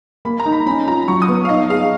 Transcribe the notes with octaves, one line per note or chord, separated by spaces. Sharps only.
A#3 B5
A#5
D#4
B5
C#4 B5
F4 A#5
F#3 C#6
D#6
B3
F5
D#4 D#5
G#4 F5